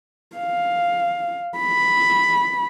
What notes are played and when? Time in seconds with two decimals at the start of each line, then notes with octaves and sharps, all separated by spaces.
0.37 F5
1.58 B5